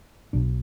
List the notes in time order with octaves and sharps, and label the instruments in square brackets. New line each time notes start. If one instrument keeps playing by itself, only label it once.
[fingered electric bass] B1 B2 D4